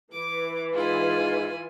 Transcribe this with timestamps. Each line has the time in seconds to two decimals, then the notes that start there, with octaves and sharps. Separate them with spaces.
0.12 E3 D6
0.74 G#2 E4 F4 G#5